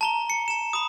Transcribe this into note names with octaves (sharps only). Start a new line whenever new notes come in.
A5 A#5 G7
C#7
A5 E7
B5 D#6